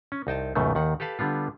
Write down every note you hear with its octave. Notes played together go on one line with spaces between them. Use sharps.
C#4
C2 D#4 G5 A5
C#2 F#2 B2 D#3 A3
D#2 D#3 F#5
G4 A4 B4 F5 A5
D3 G3 B3 F4